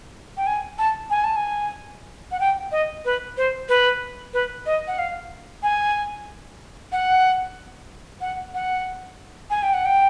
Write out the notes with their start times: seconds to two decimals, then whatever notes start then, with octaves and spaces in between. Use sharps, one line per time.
0.37 G5
0.47 G#5
0.79 A5
1.10 G#5
1.24 A5
1.36 G#5
2.32 F#5
2.40 G5
2.72 D#5
3.05 B4
3.37 C5
3.69 B4
4.34 B4
4.66 D#5
4.87 F#5
4.98 F5
5.63 G#5
6.92 F#5
8.21 F#5
8.54 F#5
9.50 G#5
9.63 G5
9.74 F#5
9.85 G5